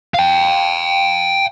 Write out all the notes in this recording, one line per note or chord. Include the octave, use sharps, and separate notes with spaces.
F5 G5